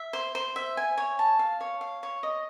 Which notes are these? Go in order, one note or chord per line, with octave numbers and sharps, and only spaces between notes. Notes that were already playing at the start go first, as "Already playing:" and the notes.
Already playing: E5
C5
C5
E5
G#5
C#5
A5
F5
C#5
F5
C#5
D#5